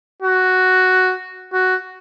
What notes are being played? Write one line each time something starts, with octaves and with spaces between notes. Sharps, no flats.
F#4
F#4